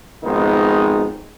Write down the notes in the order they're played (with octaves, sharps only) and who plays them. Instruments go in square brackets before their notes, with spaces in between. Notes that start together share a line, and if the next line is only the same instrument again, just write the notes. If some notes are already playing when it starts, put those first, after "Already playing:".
[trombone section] G#1 F2 D#3 G#3 B3 D#4